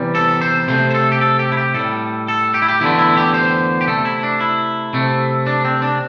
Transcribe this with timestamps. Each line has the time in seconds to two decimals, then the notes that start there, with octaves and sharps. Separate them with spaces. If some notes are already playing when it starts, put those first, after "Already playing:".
Already playing: E2 C3 E3 G3
0.15 A4
0.41 C5
0.68 C3 A3 C5
0.91 C5
0.94 A4
1.12 G4
1.21 A4
1.39 G4
1.52 E4
1.57 G4
1.74 A2 G3 A4
2.28 A4
2.54 G4
2.62 E4
2.68 G4
2.81 E2 D3 A3 E4
2.99 E4
3.17 G4
3.34 C5
3.81 G4
3.87 C3 A3 A4
4.05 E4
4.23 D4
4.40 E4
4.93 C3 A3
5.47 D4
5.65 C4
5.82 D4